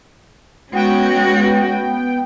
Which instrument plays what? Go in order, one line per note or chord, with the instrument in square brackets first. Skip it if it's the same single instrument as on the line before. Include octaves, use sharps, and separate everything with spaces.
[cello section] G#3 [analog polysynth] B3 G5 [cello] C#4 F#4